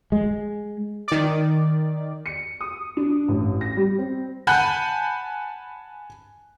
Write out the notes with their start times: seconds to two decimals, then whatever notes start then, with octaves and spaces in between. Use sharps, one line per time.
0.12 G#3
1.08 D#3 D5
2.26 C#7
2.61 D#6
2.97 D4
3.28 A1
3.61 A#6
3.77 G3
3.99 C4
4.47 F#5 G#5 A5 B5 F#6 G6